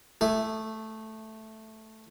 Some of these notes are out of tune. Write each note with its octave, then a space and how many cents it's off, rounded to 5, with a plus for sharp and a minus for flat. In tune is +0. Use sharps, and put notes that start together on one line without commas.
A3 +0 G#4 -35 E5 +0